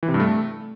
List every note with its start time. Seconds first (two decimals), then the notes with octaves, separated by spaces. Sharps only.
0.03 E3
0.08 C3
0.14 G2
0.20 A3